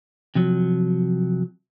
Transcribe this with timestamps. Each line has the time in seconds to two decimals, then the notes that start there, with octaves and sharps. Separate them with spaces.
0.35 C3 F3 F#3